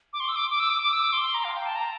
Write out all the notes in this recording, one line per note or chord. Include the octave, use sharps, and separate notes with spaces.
D6
C6
E6
D6
D6
E6
D6
D6
E6
D6
C6
C6
A#5
F5
G5
A5
A#5